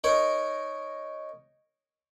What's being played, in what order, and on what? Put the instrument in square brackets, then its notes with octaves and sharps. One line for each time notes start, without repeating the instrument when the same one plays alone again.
[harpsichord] D#4 A#4 C#5